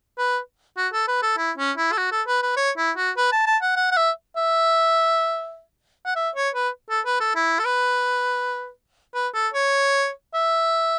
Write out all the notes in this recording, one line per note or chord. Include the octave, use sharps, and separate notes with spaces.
B4
F#4
A4
B4
A4
E4
C#4
E4
A4
F#4
A4
B4
B4
C#5
E4
F#4
B4
A5
A5
F#5
F#5
F#5
E5
E5
F#5
E5
C#5
B4
A4
B4
A4
E4
A4
B4
B4
A4
C#5
E5